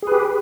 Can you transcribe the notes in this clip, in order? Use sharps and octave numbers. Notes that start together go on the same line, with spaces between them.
G4 G#4 B4